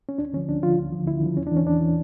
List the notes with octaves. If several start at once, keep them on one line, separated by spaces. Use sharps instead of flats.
C#4
D2 D4
D3 F3 C#4
D2 D4
D3 F3 F4
D2
D3 F3
D2 E4
D3 F3
E2 C#4
D4
E3
C#4
E2 D4
E3